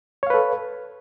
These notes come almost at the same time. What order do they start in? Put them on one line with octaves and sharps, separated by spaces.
C#5 F5 B4 A4